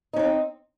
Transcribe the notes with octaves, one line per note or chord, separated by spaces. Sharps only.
C4 C#4 D#4